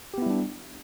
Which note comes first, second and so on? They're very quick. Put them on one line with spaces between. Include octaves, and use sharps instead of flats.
G4 B3 E4 G3 D4